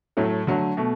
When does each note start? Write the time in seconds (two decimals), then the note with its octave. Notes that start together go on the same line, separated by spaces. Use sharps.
0.17 A2 F#3 A3
0.47 D3 F#3 A3
0.77 B2 A3